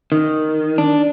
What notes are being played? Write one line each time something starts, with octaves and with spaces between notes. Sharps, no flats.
D#3
D4